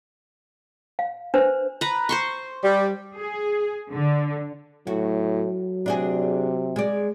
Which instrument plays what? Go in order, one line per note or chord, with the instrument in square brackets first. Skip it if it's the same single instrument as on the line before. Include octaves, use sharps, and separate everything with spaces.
[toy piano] F5
D4 B4 C5
[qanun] B4 A#5
C5 C6 C#6
[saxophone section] G3
[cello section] G#4
D3
[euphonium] A2 [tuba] F#3 [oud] F#4
[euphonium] C3 [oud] D4 F#4 G#4
[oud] G#3 D5